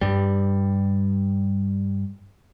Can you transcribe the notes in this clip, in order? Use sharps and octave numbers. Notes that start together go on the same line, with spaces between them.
G2 G3